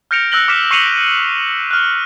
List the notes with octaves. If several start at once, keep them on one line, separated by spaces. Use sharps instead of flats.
F6 G6 A#6 C#7 D7 F7
E6 F#6 A#6 F#7 G7
D6 F6 B6 C#7 E7
C#6 C7 C#7 D#7 F7 F#7
D7
F6 F#6